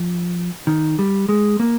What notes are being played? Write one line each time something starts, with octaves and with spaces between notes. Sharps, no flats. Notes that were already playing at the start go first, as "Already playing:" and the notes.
Already playing: F3
D#3
G3
G#3
A#3